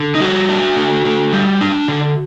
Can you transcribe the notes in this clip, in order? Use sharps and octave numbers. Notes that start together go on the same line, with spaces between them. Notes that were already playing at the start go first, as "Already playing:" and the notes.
Already playing: D3
D#4
G3 F#4
D4
D3
D3
G3
D4
D3